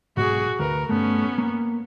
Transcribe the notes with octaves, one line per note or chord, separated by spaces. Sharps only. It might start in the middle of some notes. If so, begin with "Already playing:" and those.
B1 G#2 F#4 G#4
D2 A#4 B4
G2 A3 B3 C#4
A#3